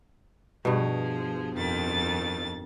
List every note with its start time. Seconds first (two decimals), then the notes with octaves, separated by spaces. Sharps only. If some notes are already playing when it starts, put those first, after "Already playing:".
0.65 G2 B2 F3 G#4
1.53 F2 D#3 A6